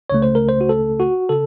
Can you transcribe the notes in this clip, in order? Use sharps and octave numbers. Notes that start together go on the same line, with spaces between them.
C#2 C#3 A3 C#5
C5
A#4
C5
F#4
A4
F#4
C#3 A4